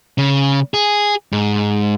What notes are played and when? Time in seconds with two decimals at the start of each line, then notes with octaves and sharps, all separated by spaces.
0.18 C#3
0.74 G#4
1.33 G#2